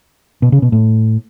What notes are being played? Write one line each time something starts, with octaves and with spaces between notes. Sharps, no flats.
B2
C#3
B2
A2